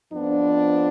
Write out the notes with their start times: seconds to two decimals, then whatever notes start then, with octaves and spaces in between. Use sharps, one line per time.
0.12 F2 F3 B3 D4